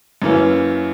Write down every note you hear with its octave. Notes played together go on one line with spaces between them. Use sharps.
F#2 E3 A#3 C#4